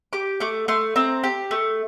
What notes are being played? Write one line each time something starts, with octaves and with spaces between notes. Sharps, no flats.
G4 D6
A3 D6
A3 C6
C4 A#5
G4
A3